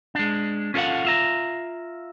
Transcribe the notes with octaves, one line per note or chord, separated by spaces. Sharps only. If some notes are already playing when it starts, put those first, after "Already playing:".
G#3 D4
C#4 F4 A4 C5 F5 F#5
F4 E5 A#5